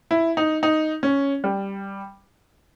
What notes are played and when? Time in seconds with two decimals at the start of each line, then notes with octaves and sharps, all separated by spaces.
0.11 E4
0.37 D#4
0.63 D#4
1.03 C#4
1.44 G3